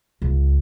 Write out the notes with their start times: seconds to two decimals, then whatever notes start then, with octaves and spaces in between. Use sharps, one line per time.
0.22 C#2